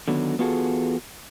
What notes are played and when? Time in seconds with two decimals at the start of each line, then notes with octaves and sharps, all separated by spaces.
0.08 D3 D#3 F#3 B3
0.38 E2 B3 F4 F#4 G#4 A4